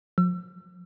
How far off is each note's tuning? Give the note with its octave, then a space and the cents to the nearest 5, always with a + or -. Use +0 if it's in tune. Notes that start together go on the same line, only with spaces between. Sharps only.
F3 +45 E6 +35